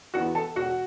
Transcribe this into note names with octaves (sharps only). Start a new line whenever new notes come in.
E2 E3 B3 F#4 F#5
A4 A5
E1 F#4 F#5